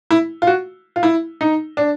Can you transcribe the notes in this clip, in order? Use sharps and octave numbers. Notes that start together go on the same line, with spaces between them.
E4
F4
F#4
F4
E4
D#4
D4